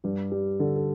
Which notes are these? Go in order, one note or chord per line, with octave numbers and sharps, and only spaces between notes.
G2 G4
G3
D3 A4
A4